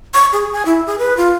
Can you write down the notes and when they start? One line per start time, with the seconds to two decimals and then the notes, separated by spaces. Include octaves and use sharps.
0.14 C#6
0.33 G#4
0.53 G#5
0.65 E4
0.87 G#4
0.99 B4
1.17 F4